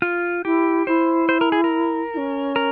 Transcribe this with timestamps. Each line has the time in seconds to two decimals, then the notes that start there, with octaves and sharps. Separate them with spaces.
0.02 F4
0.44 E4 G4
0.87 E4 C5
1.29 C5
1.41 A#4
1.52 G#4
1.64 A#4
2.14 E4
2.17 C#4
2.56 A#4